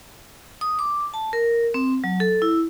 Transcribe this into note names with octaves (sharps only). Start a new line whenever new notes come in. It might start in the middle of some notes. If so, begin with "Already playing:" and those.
D#6
D6
A5
A#4
C4
F#3
A4
E4